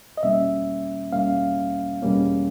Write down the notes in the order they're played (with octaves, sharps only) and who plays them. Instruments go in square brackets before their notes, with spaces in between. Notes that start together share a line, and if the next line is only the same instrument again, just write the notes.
[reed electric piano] D#5
E2 B2 G3 A#3 C#4 E5
E2 B2 G3 A#3 C#4 F5
E2 B2 G3 A#3 C#4